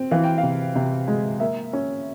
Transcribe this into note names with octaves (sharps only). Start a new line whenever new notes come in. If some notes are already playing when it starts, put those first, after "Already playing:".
Already playing: C4
E3 F5
G5
F5
C3
C3
G#3
A#3 E5
C#4